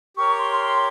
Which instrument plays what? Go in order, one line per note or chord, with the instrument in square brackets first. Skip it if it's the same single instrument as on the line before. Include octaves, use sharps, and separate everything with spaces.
[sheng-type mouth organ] G4 A#4 C#5 [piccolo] C#6
[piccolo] C6
C6